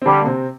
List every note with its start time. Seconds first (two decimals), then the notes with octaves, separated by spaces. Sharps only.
0.02 C4
0.05 D3 G3 D4
0.21 A#3
0.26 C3 C4